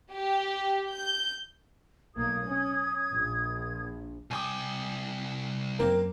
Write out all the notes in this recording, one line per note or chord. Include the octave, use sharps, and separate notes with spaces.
G4
G6
B1 A#3 D#6 G#6
C#4
A#1
C2 G5 G#5 D6 D#6
F#2 A#3 C4 A#4